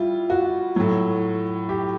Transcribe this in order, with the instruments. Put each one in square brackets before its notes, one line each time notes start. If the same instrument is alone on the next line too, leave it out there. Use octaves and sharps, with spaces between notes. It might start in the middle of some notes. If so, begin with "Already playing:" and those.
Already playing: [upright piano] G3 E4 F4
F#4
A2 F#3
G4